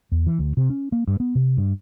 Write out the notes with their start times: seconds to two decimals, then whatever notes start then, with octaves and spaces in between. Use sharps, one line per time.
0.12 E2
0.26 E3
0.39 D2
0.57 C3
0.70 C#4
0.92 A#3
1.07 G2
1.20 B3
1.35 C3
1.57 G2